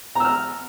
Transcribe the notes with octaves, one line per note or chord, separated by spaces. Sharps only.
A#5 E6 F6